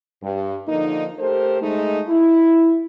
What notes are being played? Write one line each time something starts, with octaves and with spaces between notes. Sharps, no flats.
G2
D3 F3 A#3 D#4
A3 G4 A4 A#4 C5
G#3 A3 D#4
E4